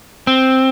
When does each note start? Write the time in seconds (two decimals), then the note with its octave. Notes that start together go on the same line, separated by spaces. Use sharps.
0.27 C4